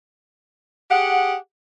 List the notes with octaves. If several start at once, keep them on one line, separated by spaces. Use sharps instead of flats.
G4 G#4 F#5